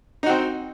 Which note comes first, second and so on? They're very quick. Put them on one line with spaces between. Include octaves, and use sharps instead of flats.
D#4 F#4 C4